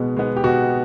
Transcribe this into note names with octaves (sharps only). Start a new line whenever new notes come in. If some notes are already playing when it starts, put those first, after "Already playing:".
Already playing: B2 G#3 B3
G#3 B3
G4
B2 F#4